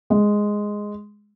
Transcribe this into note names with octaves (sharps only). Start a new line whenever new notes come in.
G#3